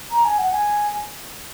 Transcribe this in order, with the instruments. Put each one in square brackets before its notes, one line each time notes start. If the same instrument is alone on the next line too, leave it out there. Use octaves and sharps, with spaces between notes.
[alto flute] A#5
G#5
F#5
G#5